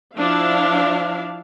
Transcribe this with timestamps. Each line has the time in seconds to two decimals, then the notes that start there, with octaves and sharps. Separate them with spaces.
0.17 F3 D4 E4 F5